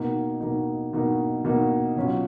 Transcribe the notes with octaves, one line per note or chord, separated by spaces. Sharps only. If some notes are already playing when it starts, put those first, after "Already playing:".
Already playing: B2 A#3 D#4
B2 A#3 D#4
B2 A#3 D#4
B2 A#3 D#4
B2 F#3 C#4 F4